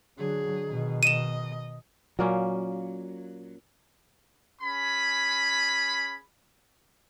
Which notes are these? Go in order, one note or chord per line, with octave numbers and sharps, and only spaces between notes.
D3 F#3 G#4
B2 D#3
D#5 D#7 E7
A#2 F#3 A#3 C#4
C#4 G#4 B5